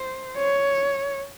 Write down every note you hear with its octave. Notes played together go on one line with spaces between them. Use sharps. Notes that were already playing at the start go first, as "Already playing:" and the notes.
Already playing: C5
C#5